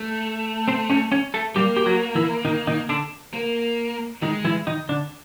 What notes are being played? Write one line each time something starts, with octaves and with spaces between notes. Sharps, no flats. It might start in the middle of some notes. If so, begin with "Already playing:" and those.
Already playing: A3
C4 C5
C#4 C#5
C#4 C#5
A3 A4
G3 A#3 G4
G4
F#3 F#4
E3 E4
D#3 D#4
D#3 D#4
D3 D4
A#3
D#3 G#3 D#4
E3 E4
D#3 D#4
D3 D4